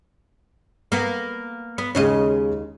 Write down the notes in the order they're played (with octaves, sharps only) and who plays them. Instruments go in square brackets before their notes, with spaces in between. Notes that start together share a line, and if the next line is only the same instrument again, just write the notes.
[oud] A#3 B3
B3
[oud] D#2 C#3 D#5 [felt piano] G#3 C#4